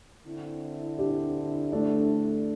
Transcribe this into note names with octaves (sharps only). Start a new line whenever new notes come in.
D3 C4 E4
D4 G4
A3 D4